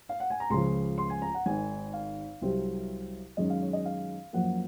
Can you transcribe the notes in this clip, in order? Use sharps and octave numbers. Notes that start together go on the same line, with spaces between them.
F5
F#5
G#5
A#5
C#2 C#3 F3 C6
C6
G#5
A#5
F#5
G#1 G#2 D#3 G#5
F5
C2 C3 F#3 C4
F#2 D#3 G#3 C#4 D#5
F5
C#5
D#5
F5
F#2 F3 A#3 F#5